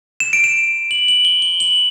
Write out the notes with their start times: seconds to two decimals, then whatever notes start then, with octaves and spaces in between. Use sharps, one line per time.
0.20 E7
0.33 D7
0.44 E7
0.91 F#7
1.08 F#7
1.25 G7
1.42 G7
1.60 F#7